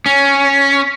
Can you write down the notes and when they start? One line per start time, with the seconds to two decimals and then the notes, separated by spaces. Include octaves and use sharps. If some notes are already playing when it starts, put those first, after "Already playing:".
0.06 C#4